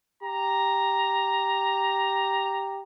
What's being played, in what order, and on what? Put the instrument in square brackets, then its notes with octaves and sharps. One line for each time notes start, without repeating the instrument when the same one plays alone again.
[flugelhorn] G4 [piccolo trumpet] A#5